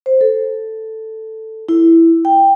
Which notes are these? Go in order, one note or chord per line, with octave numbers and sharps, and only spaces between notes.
C5
A4
E4
G5